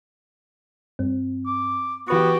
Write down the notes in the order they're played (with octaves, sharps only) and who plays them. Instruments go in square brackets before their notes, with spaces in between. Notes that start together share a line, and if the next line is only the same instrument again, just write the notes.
[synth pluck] G2 C4
[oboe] D6
[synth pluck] E3 B4 C#6 [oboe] B3 [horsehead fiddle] F#4 G4